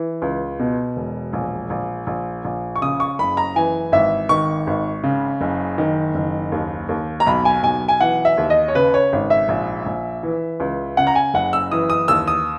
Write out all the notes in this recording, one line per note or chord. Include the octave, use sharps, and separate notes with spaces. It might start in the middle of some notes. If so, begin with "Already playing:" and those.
Already playing: E3
C#2
B2
E1
A#1
A#1
A#1
A#1
C#6
C#3 D#6
C#6
F#1 B5
A#5
E3 G#5
G#1 E5
D#3 C#6
G#1
C#3
F#1
D#3
F#1
D#2
D#2
A#5
B1 B5
G#5
B1 G#5
G#5
E3 F#5
E5
D#2
D#5
C#5
C#3 B4
C#5
G#1
E5
A#1
A#1
E3
C#2
C#3 F#5
A#5
G#5
F#1 F#5
E6
E3 D#6
D#6
D#2 E6
D#6